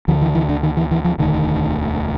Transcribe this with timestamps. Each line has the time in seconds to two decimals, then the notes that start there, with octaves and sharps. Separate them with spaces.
0.08 D2 D3 F3
0.22 E3
0.35 E3
0.49 D3
0.63 D#3
0.77 E3
0.91 E3
1.05 F3
1.18 E1 D2 D3 D#3